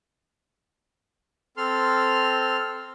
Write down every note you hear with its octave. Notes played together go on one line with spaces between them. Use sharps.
C4 A4 C6 F6